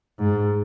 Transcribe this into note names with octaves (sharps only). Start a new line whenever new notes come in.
G#2